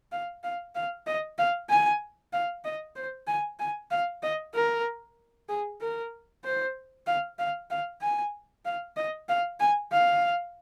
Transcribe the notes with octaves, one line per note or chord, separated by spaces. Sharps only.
F5
F5
F5
D#5
F5
G#5
F5
D#5
C5
G#5
G#5
F5
D#5
A#4
G#4
A#4
C5
F5
F5
F5
G#5
F5
D#5
F5
G#5
F5